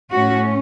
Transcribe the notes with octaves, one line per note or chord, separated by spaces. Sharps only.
A2 A3 C#4 F#4